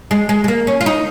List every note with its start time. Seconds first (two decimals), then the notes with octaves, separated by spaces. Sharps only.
0.11 G#3
0.29 G#3
0.44 G#3
0.48 A#3
0.67 C#4
0.81 F4
0.86 D#4